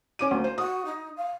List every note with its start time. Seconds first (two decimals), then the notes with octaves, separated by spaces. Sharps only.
0.19 C#4 D6 D#7
0.31 D2 A#3
0.44 C5
0.58 F#4 D#6
0.85 D#4
1.17 F5